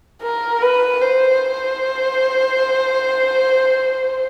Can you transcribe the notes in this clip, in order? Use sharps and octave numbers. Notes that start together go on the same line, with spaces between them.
A#4
B4
C5